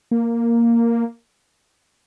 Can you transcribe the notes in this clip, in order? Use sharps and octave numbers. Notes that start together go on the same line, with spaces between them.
A#3